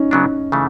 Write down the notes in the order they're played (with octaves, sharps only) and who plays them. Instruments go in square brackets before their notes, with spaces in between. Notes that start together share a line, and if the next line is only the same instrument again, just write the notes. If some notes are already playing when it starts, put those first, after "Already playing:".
Already playing: [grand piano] C#4 D#4
[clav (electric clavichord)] C#3 F#3 B3 D4
C#3 E3 A3